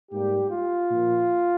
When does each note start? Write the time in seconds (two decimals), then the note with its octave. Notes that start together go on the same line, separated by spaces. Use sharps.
0.12 G#2 G3 A#3 G4
0.51 F4
0.90 A#2 F3 A#3